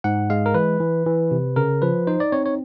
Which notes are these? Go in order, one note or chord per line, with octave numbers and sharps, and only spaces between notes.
G#2 F#5
G#3 F5
A#4
E3 B4
E3
E3
C3
C#3 A#4
F3 B4
D#4 C5
D5
C4 C#5
C#5